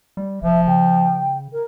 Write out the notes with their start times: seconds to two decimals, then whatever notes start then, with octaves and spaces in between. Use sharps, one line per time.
0.17 G3
0.42 F1 F3 E5
0.67 C#3 G5
1.52 A#4